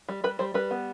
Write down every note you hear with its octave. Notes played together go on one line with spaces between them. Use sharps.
G3
G3 B4
G3 C5
G3 B4
B3